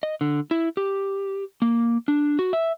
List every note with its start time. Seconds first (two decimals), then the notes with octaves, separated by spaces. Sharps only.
0.03 D#5
0.21 D3
0.51 E4
0.77 G4
1.62 A#3
2.08 D4
2.39 F#4
2.53 E5